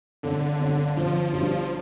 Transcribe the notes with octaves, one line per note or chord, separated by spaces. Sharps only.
G1 D3
G1
G1 F3
G2 F3